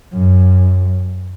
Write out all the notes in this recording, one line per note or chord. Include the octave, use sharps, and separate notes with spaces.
F#2